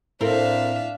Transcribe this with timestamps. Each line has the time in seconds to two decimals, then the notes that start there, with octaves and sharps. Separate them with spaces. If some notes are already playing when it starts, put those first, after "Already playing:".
0.21 A2 C4 D4 E4 A4 A#4 E5 F5